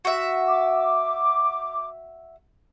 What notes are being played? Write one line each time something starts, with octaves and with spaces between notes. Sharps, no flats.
F#4 E5
D6